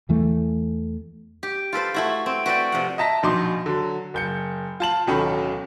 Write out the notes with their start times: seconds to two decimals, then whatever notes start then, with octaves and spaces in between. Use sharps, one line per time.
0.09 E2 E3 A3
1.43 G4
1.73 F4 A4 B4 C5
1.94 A3 E4 F#4
2.26 C4
2.46 F#4 B4 D5 G5
2.72 C3 F3 F#5
2.98 D#5 E5 A5 A#5 A#6 B6
3.23 A#1 B2 D#4 C6 D6
3.66 D3 F#3
4.14 F#1 G6 C#7
4.80 F4 A5 F#7
5.07 D1 B2 D#3 C#4 A4 B5